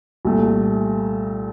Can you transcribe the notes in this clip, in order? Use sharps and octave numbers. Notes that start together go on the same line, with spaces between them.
C2 A#2 A3